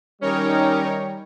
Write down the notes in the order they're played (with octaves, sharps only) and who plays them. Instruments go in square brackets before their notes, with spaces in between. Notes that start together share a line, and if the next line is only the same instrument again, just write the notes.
[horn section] D#3 G3 [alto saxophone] C#4 [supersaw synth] D#4 A#4 C#5